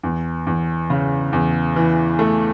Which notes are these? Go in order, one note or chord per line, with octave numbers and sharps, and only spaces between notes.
E2
E2
C#3
E2
E3
A3